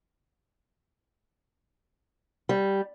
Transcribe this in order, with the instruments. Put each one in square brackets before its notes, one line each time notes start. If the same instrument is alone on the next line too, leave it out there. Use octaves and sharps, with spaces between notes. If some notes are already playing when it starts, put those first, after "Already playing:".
[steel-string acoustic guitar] G3